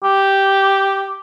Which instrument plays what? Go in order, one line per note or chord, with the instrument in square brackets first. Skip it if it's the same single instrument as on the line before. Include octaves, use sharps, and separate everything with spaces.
[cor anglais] G4